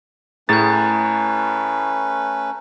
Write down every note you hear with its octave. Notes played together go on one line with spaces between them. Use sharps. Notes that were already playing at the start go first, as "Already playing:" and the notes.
A2 A3 C#4 G#4 B4 A#5 G6 A6